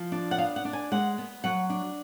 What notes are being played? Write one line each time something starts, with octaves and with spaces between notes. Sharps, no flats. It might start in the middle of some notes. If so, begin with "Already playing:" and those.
Already playing: F3
D4
F#5
B3 F5
F#5
D4
G#5
G#3 F#5
B3
F#3 F#5
D4